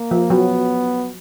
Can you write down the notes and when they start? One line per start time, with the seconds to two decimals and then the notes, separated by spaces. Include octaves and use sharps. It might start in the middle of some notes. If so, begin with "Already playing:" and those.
Already playing: A#3
0.11 F3
0.30 F#3 B3